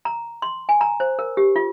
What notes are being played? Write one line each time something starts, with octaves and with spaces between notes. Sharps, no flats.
A#5
C6
G#5
A#5
C5
A#4
G4
F4